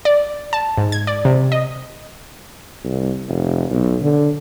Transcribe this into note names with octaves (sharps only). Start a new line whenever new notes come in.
D5
A5
G#2
G#6
D5
C3
D#5
C2
F1
B1
D3